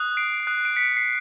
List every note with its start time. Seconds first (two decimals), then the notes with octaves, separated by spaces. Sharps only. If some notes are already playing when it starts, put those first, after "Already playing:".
Already playing: D#6 F#6
0.17 C7 D7
0.47 D#6 F#6
0.65 D7
0.76 B6 C#7
0.97 C7